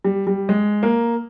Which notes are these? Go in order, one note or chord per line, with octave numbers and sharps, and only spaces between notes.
G3
G3
G#3
A#3